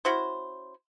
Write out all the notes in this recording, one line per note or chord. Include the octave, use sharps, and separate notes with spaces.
C#4 E4 F#4 C5